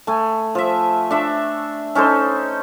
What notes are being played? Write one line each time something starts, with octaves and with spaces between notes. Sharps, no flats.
A3 G#5
F3 E5
D4 E5 C#6
C#4 D#4 A4 C5